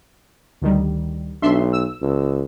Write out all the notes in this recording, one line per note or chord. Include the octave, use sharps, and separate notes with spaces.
D2 D#3 G3
B1 D4 E5 C6
E6
C#2